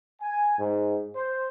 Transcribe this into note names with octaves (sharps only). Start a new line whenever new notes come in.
G#5
G#2
C5